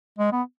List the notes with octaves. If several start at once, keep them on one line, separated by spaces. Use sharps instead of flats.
G#3
B3